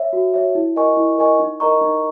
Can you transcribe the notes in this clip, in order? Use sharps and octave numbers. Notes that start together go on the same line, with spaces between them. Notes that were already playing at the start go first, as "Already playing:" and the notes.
Already playing: C#5 E5
F#4
C#5 E5
E4
A#4 D#5 G#5 C#6
E4
A#4 D#5 G#5 C#6
D#4
A#4 D#5 A#5 C#6
D#4